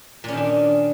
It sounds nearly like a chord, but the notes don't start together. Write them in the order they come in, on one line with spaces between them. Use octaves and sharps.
A#2 C#4 D#3 D4